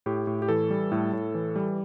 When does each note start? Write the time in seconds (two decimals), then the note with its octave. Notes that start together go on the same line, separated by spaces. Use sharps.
0.06 A2 G4
0.27 A2
0.42 G4
0.48 E3 A4
0.70 G3
0.92 A2
1.13 A2
1.35 E3
1.56 G3